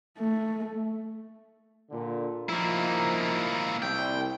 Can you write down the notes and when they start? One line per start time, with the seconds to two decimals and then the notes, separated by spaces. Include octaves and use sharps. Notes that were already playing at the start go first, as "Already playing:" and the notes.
0.18 A3
1.91 A#2 D3
2.49 F3 A#3 D#4 E4 A#5
3.82 C2 G5